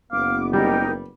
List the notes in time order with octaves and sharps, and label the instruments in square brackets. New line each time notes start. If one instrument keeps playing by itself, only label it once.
[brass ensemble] F#1 B3 [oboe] F5 [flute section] D6
[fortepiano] G3 [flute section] D#4 G4 A#4 [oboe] G5